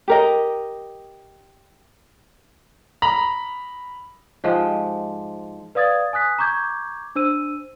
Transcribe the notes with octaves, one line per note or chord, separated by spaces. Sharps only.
G4 A#4 D#5
A#5 B5
G#2 F3 G#3 G4
B4 D5 F5 D#6 G#6 A6
G#5 D#6 F#6 B6
A#5 C#6 D6 G6 G#6
D4 C5 E6 D#7